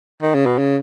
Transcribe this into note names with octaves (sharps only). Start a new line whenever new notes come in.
D#3
C#3
B2
C#3